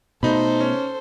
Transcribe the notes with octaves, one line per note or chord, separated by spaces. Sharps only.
B2 A3 D#4 A4 C5 B5
C#4